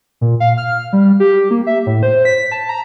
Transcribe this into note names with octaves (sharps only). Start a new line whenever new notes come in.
A#2
F5
F6
G3
G4
A#3
E5
A2
C5
B6
A5
A#5